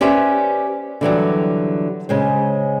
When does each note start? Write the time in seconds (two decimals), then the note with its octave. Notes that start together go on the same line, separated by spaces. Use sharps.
0.01 C#4 G4 B4 C5 D5 E5
1.01 D3 E3 F#3 G3
2.09 C#3 G#3 C5